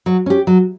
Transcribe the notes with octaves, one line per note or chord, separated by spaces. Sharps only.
F#3
C#4 G4
F#3